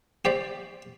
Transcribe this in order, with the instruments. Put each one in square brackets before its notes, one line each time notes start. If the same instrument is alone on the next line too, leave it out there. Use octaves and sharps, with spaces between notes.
[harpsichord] G4 C5 D5